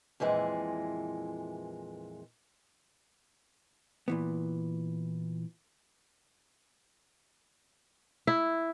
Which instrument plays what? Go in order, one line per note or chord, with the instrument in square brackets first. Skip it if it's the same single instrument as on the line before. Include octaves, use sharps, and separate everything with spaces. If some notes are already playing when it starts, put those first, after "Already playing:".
[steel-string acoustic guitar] F2 A#2 E3 G#3
[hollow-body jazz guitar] A#2 E3 B3
[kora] E4